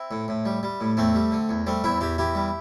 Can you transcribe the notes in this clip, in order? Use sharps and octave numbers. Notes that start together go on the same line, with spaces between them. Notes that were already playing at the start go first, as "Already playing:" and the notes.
Already playing: C4 E4
A2
A2
G3
G3
A2
E2 A3 C4
G3
D3
E2
G3 A3 C4
E2 C4 E4
E2 E4 G4
E2 E4 G4
G3